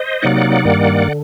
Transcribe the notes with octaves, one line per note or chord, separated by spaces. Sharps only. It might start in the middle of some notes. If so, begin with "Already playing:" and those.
Already playing: C5 D#5
C3 F#3 A#3 D#4 D5 F#5
G2 D#3 G3 A#3
D3